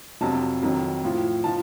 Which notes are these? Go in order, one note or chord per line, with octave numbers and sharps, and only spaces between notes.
F2 C3 F#3 A5
F2 D#3 F#3
A2 F3
F3 A5